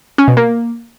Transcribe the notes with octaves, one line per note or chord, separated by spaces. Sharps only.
C#4
B2
A#3